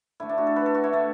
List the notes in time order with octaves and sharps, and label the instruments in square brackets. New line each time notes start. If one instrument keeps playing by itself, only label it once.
[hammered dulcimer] D3 A3 E4
D4
F#4
A4
B4
A4
F#4
E4
D3 A3